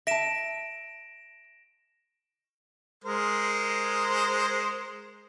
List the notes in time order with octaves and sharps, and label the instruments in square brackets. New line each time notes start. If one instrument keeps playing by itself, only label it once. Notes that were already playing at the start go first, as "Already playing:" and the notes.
[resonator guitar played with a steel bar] E5 A5 [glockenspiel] A#6 D7 E7
[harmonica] G#3 A#4 C5